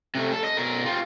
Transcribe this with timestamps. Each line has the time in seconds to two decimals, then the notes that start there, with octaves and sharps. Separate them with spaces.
0.15 C3 A3
0.32 A4
0.44 D#5
0.57 B2 A#4
0.85 F4 G4